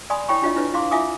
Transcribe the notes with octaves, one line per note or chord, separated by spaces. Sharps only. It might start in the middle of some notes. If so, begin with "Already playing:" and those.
D5 G#5 B5 C6 D#6
E4 C#5 G5 B5 C#6
D4 F4 C#5 D#5
D4 E4 B4 C#5
E4 F5 C6 D6
E4 F4 E5 G#5 D6 D#6